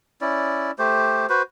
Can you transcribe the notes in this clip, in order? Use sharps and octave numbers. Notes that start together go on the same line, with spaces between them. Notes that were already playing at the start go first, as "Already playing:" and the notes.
C#4 E4 D5
A3 G4 C5
F#4 B4 C5